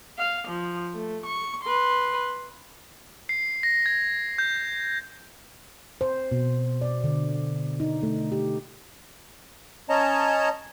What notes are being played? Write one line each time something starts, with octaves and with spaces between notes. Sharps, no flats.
F5
F3
A3
C#6
B4 C6
C7
A#6
G#6
G6
C5
B2
D5
D3
D#4
A3
G4
C#4 C#5 D#5 A5 A#5